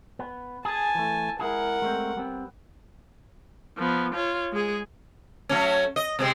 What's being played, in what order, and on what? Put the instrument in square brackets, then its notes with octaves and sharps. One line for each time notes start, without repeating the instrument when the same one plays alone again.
[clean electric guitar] B3
[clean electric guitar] G#4 [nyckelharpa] G#5 A5
[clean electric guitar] E3 A3
[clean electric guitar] G#3 E4 G#4 [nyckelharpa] A#4 F#5
[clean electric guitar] G#3 A3 C4
G3 B3 C4
[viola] F3 B3
F4 C#5
G#3 G#4
[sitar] F#3 A3 C#4
D#5
C3 G#3 C4